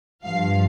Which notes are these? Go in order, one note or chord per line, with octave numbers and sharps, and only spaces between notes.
G2 F3 F5